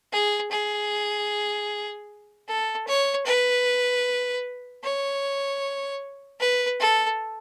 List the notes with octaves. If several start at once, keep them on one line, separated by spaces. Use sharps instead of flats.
G#4
G#4
A4
C#5
B4
C#5
B4
A4